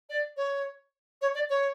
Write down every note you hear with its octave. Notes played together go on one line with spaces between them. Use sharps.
D5
C#5
C#5
D5
C#5